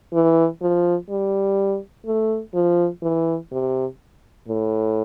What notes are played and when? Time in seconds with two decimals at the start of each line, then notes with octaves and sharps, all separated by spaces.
0.13 E3
0.62 F3
1.10 G3
2.06 A3
2.54 F3
3.02 E3
3.52 C3
4.48 A2